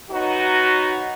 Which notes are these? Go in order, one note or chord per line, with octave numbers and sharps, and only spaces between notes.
F#3 B3 D#4 F#4